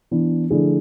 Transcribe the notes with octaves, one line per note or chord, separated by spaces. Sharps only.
E3 B3 D4
D3 F3 A3 E4 G#4